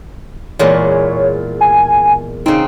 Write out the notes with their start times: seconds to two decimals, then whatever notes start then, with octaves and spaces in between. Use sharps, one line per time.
0.59 E2 A#2 G#3 C#5
1.61 G#5
2.46 C#3 C4 D#4